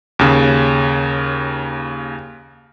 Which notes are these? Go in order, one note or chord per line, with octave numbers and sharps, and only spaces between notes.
D#2 C#3